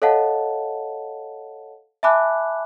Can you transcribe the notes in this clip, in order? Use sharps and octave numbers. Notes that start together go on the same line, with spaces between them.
A4 C#5 D#5 F5 F#5 A5
E5 G#5 A5 B5 D6 F#6